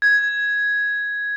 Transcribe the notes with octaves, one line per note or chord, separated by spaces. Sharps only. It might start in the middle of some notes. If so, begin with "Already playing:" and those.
G#6